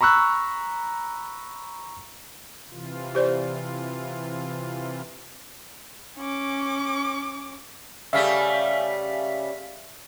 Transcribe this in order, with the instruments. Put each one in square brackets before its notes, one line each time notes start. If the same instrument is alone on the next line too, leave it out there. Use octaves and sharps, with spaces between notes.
[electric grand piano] A#5 B5 C#6 E6 F#6
[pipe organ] C3 E3 F4
[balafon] G4 C5 D5
[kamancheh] C#4 D6
[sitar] C#3 G3 A3 [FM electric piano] E5 F5 B6